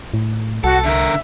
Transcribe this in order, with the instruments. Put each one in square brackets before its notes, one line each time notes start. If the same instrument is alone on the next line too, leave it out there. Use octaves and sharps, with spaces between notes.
[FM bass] A2
[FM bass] C2 [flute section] F#4 F#5 [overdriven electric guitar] A4
[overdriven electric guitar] D3 A#4 [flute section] E5